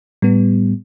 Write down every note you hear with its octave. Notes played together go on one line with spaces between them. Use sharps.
A2 G3 B3